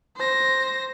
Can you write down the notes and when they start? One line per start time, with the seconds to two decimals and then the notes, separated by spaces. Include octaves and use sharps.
0.17 C5 A#6